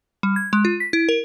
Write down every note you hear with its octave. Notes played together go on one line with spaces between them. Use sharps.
G3
G#6
G#3
F4
B6
E4
A#4